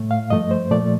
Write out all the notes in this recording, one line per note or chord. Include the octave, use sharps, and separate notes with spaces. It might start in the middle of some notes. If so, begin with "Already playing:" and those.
Already playing: A2 A3
F5
G2 F3 A3 D#5
C5
A#2 F3 A3 D5